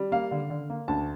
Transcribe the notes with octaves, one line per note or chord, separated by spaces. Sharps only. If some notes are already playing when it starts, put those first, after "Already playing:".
Already playing: G3
A#3 F5
D3
D3
A#3
D2 A5